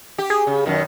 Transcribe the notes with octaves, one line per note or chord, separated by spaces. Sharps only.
G4
G#4
C#3
F#2 B2 D#3